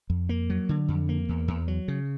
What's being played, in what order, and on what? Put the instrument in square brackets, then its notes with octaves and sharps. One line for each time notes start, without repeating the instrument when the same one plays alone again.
[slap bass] F2
A#3
F#3
D3
F2
A#3
E2
E2
F#3
C#3